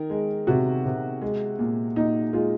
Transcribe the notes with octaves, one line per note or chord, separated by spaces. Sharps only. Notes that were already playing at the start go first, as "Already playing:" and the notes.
Already playing: D#3 A#4
G#3
C3 F#4
C3
G#3
A#2
A#2 D#4
G#3 F4